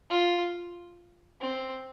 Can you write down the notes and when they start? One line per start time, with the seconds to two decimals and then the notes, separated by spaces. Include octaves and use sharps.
0.10 F4
1.41 C4